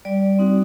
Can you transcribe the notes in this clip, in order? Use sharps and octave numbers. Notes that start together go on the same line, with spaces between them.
G3 D5
C4 D#4 F#4